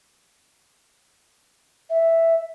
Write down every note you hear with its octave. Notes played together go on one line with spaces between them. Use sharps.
E5